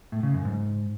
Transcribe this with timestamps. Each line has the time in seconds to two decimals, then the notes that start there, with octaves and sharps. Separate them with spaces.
0.12 A2
0.23 C#3
0.34 F#2
0.45 G#2